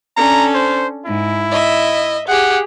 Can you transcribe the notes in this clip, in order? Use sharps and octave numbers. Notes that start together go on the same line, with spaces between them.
C#4 D4 A4 A#5
C5
G#2 E4
D#5 E5
G4 G#4 F#5